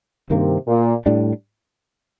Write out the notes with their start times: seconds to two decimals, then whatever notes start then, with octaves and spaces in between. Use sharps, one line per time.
0.30 G2 C3 D#3 A#3
0.67 A#2
1.06 A2 G3 D4